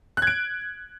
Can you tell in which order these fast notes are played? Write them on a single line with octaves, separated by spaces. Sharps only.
F#6 G#6 D7